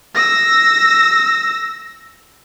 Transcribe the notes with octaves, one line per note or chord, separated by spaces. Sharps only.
E6 A#6